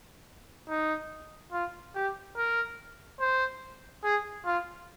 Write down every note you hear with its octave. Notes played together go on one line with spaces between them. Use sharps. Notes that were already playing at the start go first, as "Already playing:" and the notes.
D#4
F4
G4
A#4
C5
G#4
F4